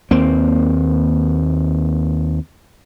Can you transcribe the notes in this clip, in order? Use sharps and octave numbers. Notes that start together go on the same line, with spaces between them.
D#2 A#3 C4